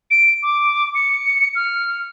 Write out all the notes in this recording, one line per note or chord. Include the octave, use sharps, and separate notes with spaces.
D7
D6
C#7
F6